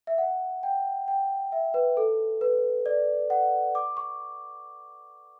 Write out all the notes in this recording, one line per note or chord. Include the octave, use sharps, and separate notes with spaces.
E5
F#5
G5
G5
E5
B4
A4
B4
D5
F#5
D6
C#6